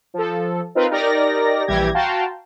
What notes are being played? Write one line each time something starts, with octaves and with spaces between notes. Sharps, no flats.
F3 A4
C4 D#4 F4 A#4 B4
D#4 G4 A#4 D5 A#6
A#1 E3 G3 G4 G#6 A#6
F#4 F5 G5 A5 A#5 C6